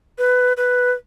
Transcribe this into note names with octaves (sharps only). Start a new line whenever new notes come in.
B4
B4